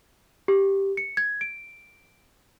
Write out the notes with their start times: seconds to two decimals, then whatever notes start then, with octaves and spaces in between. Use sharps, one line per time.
0.48 G4
0.97 C#7
1.17 G#6
1.41 D7